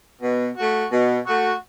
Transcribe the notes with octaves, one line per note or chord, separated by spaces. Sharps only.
B2
A3 F#4
B2
A3 F#4